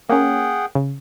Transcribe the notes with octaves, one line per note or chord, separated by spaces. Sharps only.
A#3 C#4 G#4 F#5 G5
C#3